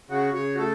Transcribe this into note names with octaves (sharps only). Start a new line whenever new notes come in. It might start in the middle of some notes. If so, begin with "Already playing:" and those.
C#3 F#4
C#3 C#5
F#4
A3 A4